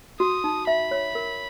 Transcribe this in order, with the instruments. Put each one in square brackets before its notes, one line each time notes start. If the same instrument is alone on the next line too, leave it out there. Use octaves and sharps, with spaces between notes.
[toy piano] F#4 [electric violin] D#6
[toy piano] D#4
[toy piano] E5 [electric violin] B5
[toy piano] C#5
A#4